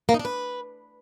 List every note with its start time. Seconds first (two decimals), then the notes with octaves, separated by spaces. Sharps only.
0.09 A#3
0.14 D#4
0.19 D4
0.25 B4